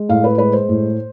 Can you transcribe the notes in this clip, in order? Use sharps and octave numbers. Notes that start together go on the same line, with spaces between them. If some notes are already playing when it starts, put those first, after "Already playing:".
Already playing: G#3
A2 F5
B4
G#3 B4
C5
A2